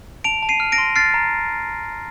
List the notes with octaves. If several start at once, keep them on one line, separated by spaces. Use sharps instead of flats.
A5 D7 F7
A5
C7 D#7
F6
A#6 D7
C6
F6 A6 C7
A#5